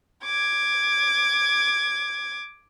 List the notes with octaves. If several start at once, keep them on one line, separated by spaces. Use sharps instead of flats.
D6 G#6